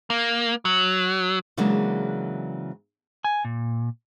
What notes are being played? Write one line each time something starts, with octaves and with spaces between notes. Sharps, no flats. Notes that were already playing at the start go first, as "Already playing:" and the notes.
A#3
F#3
C#3 E3 F#3 G#3 A#3 D4
G#5
A#2